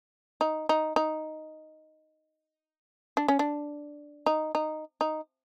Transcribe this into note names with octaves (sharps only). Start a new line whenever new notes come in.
D#4
D#4
D#4
D4
C#4
D4
D#4
D#4
D#4